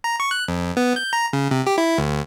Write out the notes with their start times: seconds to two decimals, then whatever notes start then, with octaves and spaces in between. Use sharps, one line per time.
0.04 A#5
0.20 C#6
0.31 F#6
0.48 F2
0.77 B3
0.96 G6
1.13 A#5
1.33 C#3
1.51 C3
1.66 G4
1.78 E4
1.98 D2